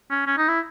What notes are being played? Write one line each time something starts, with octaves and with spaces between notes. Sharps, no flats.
C#4
C#4
D#4
E4